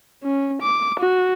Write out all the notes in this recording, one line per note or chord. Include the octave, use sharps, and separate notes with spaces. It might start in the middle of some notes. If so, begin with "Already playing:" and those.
C#4
D6
F#4